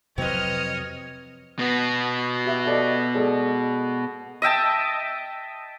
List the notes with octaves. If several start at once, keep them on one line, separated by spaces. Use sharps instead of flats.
F2 C3 F#3 C4 B4 C#5 D#5 F6
B2 B3
G4 E5
A4 D5 D#5
G#3 A4 D5
D#5 E5 G5 A5